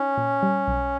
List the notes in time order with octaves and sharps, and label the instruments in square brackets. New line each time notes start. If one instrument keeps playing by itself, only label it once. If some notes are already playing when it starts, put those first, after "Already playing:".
Already playing: [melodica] C#4 [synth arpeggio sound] D#4
[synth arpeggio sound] A#2
G3
B1